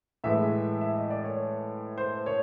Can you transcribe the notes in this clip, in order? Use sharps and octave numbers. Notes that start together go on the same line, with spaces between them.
A2 E3 G#3 E5
E5
D#5
D5
C#5
C5
C#5